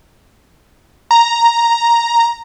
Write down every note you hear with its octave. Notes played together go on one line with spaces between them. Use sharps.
A#5